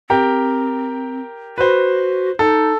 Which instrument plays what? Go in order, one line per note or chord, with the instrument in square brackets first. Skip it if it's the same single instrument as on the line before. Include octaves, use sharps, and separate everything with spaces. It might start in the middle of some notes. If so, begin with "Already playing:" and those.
[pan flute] C4 [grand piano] G4 A#4 G5
[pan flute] F#4 [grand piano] B4 C5
[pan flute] D#4 [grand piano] A4